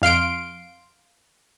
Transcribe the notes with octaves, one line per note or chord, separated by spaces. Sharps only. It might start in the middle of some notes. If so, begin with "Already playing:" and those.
F2 F5 C6 D7